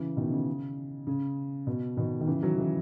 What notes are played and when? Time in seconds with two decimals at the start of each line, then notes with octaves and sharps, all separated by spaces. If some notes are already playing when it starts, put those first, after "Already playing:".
Already playing: C#3 E3
0.17 B2 D#3
0.32 C#3
1.07 C#3
1.67 B2
1.97 B2 D#3
2.20 D#3
2.27 C#3 E3
2.42 D#3 F#3
2.57 C#3 E3